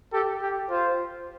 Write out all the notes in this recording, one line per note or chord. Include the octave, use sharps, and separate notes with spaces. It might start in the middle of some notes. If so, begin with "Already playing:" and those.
G4 A4
G4
F4 C5